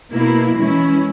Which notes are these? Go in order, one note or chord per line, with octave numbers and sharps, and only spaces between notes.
B2 A#3 E4
E3 G#3 C#4 E4